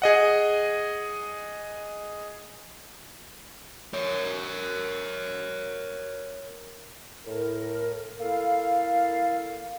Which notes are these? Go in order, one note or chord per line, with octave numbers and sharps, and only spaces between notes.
G#4 D#5 F#5
A#4 C#5
A2 A#4
A#3 E4 A4 F5